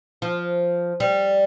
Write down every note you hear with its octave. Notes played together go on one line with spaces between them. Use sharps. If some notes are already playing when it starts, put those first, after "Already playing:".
F3
G3